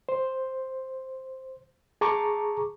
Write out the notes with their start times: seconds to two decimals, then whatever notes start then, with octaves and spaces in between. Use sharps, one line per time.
0.09 C5
2.01 G#4 A5 A#5 C#6 D6